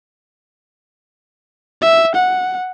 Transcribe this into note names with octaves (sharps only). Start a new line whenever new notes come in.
E5
F#5